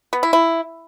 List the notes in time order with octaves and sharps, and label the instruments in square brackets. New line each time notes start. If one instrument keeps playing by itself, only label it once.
[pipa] B3
E4
E4